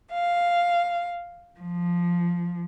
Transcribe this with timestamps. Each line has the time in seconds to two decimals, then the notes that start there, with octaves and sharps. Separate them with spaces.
0.12 F5
1.59 F3